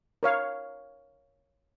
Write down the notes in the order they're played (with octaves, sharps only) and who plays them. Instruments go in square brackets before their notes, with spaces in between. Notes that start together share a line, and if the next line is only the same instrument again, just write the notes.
[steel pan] A#4 C#5 F5